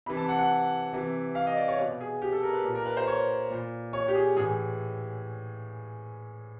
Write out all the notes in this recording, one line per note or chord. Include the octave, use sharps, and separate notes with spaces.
C3 E3 B5
A5
F#5
F#5
C3 E3
F5
D#5
D5
C#5
B2 B4
G#4
G4
A4
A#4
B4
A#2
A#4
B4
C5
C#5
A#2
C#5
G4
G#4
A2 E3 G#4